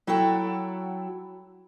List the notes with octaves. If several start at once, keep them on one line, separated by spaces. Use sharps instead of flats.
F#3 E4 F#4 A4 G5